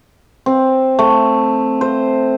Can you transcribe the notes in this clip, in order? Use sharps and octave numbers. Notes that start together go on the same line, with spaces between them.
C4
A3
C5